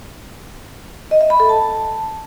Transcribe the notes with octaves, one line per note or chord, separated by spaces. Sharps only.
D#5
E5
B5
A4
A5